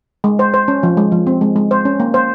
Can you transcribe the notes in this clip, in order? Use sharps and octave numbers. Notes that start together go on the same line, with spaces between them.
G#3
C5
C5
C#4
F3
G#3
F3
C4
G#3
G#3
C5
C#4
A#3
C5